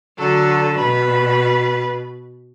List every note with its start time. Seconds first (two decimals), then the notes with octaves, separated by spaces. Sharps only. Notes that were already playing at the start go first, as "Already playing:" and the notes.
0.18 D3 F#3 A4
0.77 B2 B4